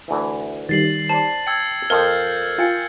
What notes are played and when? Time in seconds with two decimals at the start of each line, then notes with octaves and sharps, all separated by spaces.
0.08 D2 E3
0.69 D#3 G3 A6 C7 F#7
1.09 C5 D5 A5
1.47 G5 E6 G#6 C#7
1.90 F2 F3 A#4 F6 G6
2.58 F4 G5 G#5 A6 C#7